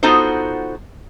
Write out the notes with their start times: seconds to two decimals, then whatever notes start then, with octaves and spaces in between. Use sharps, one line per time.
0.03 B3 D#4 F4 F#4 A4 C5